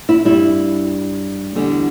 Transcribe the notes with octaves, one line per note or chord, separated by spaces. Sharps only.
E4
G2 G3 E4
E2 D3 G3